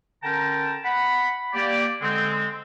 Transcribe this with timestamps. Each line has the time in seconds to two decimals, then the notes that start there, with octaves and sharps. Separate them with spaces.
0.23 D3 C#4 A#4 G5 A5 A#5
0.84 F#5 B5
1.54 A#3 G4 D5
2.01 D3 G#3 C4